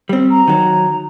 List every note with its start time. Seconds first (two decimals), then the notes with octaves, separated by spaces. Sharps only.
0.09 G3 C4
0.31 A#5
0.48 D#3 F#3